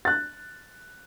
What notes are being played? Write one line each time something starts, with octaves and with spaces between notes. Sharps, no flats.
F#6 A6